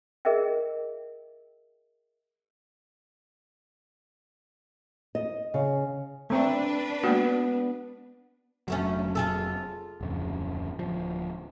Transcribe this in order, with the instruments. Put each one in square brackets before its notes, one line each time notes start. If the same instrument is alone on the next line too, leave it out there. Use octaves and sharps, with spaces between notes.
[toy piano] G#4 A#4 D#5 E5 G5
[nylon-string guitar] D#5
C#3
[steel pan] A3 C4 [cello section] D4 B4
[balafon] G#3 A#3 F#4 [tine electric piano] B3
[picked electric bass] F1 F#3 [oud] D2 A3 C#4
[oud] F4 G#4 A4
[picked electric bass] D1 F2 C#3
D1 F3